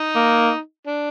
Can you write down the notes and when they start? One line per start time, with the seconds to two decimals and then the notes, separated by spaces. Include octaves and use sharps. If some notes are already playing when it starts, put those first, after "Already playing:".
Already playing: D#4
0.16 A#3
0.87 D4